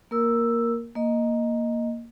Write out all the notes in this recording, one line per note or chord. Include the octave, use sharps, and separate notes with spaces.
A#3 A#4 E6
A#3 D#5